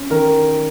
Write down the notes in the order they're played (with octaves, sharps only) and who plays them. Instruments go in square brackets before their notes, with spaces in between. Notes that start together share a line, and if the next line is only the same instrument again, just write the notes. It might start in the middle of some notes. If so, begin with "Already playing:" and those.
Already playing: [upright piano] C#4
D#3 A#4